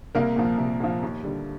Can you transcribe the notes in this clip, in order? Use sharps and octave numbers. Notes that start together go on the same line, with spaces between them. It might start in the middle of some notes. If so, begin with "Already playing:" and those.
C2 A#3 A#4
A#2 F3
C2
A#2 F3
D#2
D3 G3